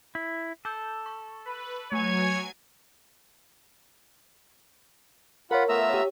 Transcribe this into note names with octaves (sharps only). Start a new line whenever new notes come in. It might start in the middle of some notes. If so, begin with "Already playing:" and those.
E4
A4 D6 E6 G6
C#6
B4
F#3 A3 C#5 G#5 G#6
F4 A#4 C#5 F#5 B5
A3 B3 F4 E5 A#5 E6
G4 C#5